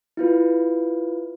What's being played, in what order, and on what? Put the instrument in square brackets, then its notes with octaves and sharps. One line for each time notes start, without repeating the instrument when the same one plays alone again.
[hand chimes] E4 F4 B4